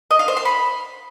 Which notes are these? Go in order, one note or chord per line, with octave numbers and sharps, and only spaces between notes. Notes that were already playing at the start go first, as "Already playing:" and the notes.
D#5
F5
C5
C6
B5